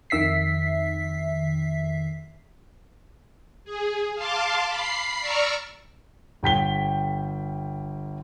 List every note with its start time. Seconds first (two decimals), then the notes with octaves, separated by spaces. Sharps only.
0.10 F2 D#3 E5 B6 C7
3.64 G#4
4.15 F5 A5 C6 D6
4.66 B5 C7
5.19 D5 A#5 C#6 D6 E6 F6
6.43 G1 G5 B6 G7